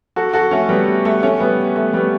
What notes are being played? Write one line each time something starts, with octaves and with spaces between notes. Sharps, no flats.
F#4 A4
F#4 A4
A3 C#4
G3 B3
A3
A3 C#4
G3 B3
A3
G3 B3